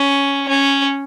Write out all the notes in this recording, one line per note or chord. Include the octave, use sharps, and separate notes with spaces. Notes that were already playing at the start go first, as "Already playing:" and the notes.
Already playing: C#4
C#4